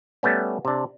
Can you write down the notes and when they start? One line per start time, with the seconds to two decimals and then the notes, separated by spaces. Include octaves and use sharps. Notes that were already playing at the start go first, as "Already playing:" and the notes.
0.23 G3 A3 B3 C#4
0.65 C3 D4